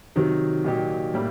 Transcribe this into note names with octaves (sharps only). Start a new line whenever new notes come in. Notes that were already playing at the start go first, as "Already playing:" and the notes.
C3 D#3 F#3
A#2 F#3 A#3 D#4 G4
A2 G3 A#3